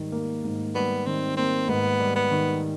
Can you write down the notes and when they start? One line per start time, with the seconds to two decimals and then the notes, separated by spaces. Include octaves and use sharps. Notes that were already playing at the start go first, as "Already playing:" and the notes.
Already playing: G#2 D#3 G3
0.12 A#3
0.44 G#2
0.75 G3 B3
1.06 D#3 C4
1.37 A#3 C4
1.68 G#2 B3
2.00 G3
2.16 B3
2.31 D#3